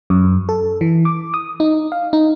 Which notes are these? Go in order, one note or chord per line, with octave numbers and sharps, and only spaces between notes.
F#2
A4
E3
D6
D#6
D#4
F5
D#4